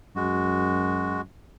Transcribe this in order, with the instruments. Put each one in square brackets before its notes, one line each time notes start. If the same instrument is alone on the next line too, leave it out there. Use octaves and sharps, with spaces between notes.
[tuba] F#2 [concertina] G#3 F#4